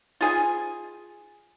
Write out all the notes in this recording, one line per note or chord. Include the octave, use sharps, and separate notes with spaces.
F4 G#4 G#5